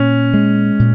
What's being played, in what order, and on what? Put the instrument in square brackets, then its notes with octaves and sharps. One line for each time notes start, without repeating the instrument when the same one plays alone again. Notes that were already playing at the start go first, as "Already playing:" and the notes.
Already playing: [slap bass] A#2 [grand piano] C#4
[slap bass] G#3
A#2